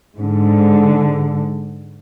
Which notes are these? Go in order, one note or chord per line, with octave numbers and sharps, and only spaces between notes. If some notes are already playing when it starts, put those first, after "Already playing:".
G#2 D3